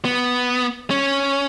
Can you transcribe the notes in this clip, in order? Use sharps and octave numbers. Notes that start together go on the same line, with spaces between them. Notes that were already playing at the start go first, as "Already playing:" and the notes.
B3
C#4